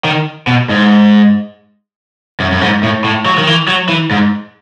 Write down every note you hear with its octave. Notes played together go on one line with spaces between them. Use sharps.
D#3
B2
G#2
F#2
F#2
G#2
A2
A2
F#3
D#3
E3
F#3
E3
G#2